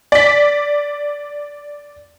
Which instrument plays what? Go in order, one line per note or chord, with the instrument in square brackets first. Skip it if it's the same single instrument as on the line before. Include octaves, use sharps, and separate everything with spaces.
[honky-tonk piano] D5 B6